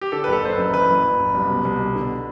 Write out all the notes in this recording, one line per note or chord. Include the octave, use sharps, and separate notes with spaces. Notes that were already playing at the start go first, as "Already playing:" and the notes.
G4
D3 A4
B4
F#1
A4
F#1 C5
F#2 B4
E3 B4
F#1
F#1
F#2
C2
B2
C2
B2
D3